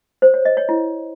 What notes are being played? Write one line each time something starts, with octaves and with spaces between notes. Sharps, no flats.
C5
C#5
D#5
C#5
E4